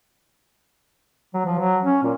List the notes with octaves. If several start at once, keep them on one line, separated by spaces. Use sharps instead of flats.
F#3
F3
F#3
C#4
A#2